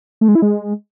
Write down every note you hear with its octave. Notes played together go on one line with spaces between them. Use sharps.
A3
G#3
E4
G#3